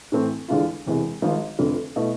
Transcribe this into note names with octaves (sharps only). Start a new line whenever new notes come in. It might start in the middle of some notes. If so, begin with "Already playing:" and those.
A2 E3 A3 C4
E2 D3 G#3 D4 F4
E1 E2 C3 G#3
G#1 G#2 F3
F1 F2 D3
B2 A3 E4